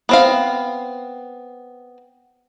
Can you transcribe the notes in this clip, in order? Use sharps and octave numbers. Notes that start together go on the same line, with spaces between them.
B3 C4 F5